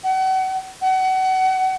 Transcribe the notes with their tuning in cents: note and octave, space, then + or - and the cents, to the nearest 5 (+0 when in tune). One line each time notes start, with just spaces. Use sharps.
F#5 +35
F#5 +30